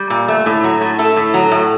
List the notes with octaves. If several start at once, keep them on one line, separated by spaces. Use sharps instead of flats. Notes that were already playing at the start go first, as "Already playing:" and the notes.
Already playing: G3
A#2
A3
A2
F#3
A2
A3 A4
A2
F#3
A2